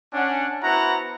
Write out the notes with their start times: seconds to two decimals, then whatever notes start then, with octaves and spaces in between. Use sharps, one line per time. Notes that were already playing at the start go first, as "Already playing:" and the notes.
0.13 C#4 D4 F#5
0.63 B3 E4 F#4 C5 F#5 A#5